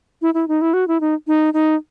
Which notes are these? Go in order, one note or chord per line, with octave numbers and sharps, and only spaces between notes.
E4
E4
D#4
E4
F#4
E4
D#4
D#4
D#4